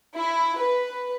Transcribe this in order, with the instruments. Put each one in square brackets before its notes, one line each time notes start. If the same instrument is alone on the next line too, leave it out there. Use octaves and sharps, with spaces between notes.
[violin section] E4
B4